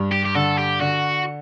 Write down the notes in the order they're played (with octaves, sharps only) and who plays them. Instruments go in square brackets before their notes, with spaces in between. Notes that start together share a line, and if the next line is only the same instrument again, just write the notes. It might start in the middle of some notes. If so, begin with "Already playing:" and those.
Already playing: [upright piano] G2
[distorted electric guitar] G4
G4
[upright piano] D3 [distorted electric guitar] A4
[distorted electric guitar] G4
[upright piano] D3 [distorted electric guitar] F#4